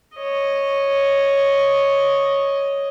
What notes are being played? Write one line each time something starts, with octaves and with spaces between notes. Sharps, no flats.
C#5 D#5